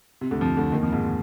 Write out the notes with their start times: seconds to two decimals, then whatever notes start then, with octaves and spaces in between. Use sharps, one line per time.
0.21 C3
0.31 D2 D3
0.41 F2 F3
0.57 D2 D3
0.72 D#2 D#3
0.82 F2 F3
0.92 G#2 G#3